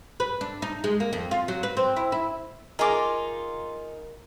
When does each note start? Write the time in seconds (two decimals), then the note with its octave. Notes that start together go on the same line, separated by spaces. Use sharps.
0.20 B4
0.41 D4
0.62 D#4
0.84 G#3
1.00 A#3
1.13 F2
1.31 F4
1.48 F#3
1.63 B4
1.77 C4
1.96 E4
2.12 E4
2.79 D#4 F4 G#4 A#4 D6